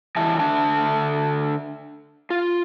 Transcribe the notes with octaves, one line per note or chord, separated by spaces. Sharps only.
E2 E3 D#5 E5 A5
D3 D4 E5 A5
F4